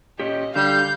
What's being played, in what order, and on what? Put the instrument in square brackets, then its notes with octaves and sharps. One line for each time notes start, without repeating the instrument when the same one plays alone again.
[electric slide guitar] A#2 C#4 G4 [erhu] D#5
[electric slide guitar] D3 [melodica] G3 [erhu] F5 [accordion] G6